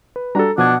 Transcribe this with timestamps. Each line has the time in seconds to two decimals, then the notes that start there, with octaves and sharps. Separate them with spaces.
0.16 B4
0.35 G3 D4 F#4 A4 A#5
0.58 B2 F3 D4 F#5 D#6 G#6